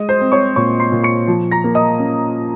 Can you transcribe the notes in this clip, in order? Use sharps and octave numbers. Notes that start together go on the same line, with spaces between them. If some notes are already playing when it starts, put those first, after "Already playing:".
Already playing: G#3 D#5 D#6
C5 C6
C4
C#5 C#6
A#2 C#5 C#6
C6 C7
A#2
C#6 C#7
F3
A#5 A#6
A#3
D#5 D#6
C#4